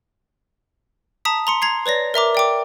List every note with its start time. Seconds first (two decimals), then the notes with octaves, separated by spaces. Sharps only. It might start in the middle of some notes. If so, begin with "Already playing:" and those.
1.25 A5 A#5 D#6 B6
1.47 A#5 C6 C#7
1.62 A#5 G#6 C7
1.86 B4 C#5 D5 A#6
2.14 A#4 E5 A#5 D6
2.35 D5 G5 D6